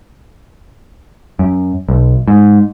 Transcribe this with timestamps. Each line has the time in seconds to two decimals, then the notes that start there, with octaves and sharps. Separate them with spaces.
1.39 F#2
1.89 B1
2.28 G#2